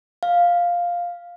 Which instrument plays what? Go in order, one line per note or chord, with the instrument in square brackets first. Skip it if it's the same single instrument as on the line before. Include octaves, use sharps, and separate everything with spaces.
[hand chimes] F5